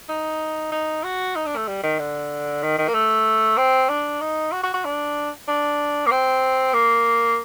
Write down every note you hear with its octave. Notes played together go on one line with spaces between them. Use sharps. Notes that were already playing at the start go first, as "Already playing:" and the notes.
D#4
D#4
F#4
D#4
D4
A3
G3
D#3
D3
D#3
D#3
A#3
A3
C4
D4
D#4
F#4
F#4
F#4
D4
D4
A#3
C4
A#3